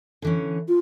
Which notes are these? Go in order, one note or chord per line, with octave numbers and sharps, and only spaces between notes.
D3 E3 C#4
F4